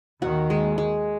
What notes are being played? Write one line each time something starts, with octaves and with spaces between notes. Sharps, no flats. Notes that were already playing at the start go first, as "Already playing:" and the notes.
D#2 D#3 F#4
G#3
G#3